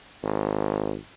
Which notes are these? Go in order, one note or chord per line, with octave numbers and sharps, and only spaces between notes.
G#1